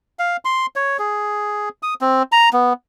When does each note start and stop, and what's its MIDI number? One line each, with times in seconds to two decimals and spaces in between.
0.19 0.37 77
0.45 0.66 84
0.76 0.97 73
0.99 1.69 68
1.83 1.94 87
2.01 2.23 60
2.32 2.49 82
2.53 2.73 59